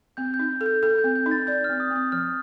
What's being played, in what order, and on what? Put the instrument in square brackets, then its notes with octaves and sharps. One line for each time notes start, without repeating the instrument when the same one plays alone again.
[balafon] C4 [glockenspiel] G6
[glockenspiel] G6
[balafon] D#4
A4
[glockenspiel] G6
[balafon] A4 [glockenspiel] G6
[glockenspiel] G6
[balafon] C4
[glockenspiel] G6
[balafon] D#4
[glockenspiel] A6
[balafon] D5 [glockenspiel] G6
[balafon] C4 [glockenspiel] F6
[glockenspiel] D#6
[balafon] C4
[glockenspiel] D#6
[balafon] F3 [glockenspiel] F6